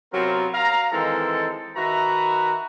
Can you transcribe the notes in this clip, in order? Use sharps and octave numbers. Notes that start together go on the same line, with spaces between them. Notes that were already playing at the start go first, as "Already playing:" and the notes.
C3 F#3 B3 C4 F4 A#4
F5 A#5
D#3 E3 G#3 C4 D#4 A4
D#3 F#4 B4 E5 A#5